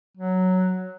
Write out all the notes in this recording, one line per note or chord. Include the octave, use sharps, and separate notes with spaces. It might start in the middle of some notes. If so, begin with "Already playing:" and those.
F#3